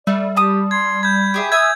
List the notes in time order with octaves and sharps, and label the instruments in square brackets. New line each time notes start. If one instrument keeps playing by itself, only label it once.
[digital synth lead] G3 [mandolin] A3 [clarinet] D5
[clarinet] G4 [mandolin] A5 D#6
[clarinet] C6 [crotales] G#6
[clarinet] B5 [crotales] G6 G#6
[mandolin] G4 G#4 E5
[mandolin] E5 G#5 D#6 [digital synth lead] E6 [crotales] G#6